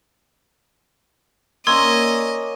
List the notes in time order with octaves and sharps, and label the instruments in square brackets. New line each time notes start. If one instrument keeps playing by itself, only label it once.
[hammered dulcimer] A#3 C#4 D5 [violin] D#5 [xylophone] C6 E6 G#6